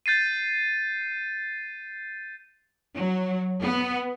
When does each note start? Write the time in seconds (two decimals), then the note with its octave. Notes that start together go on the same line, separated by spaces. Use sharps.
0.06 G6 A6 C7 D#7
2.95 F#3
3.62 B3